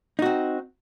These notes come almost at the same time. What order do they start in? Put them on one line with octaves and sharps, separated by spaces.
D#4 F#4 C4